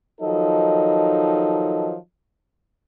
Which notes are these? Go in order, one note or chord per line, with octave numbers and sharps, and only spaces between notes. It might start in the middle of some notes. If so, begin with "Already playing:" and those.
D#3 F3 F#3 D#4 A4 D#5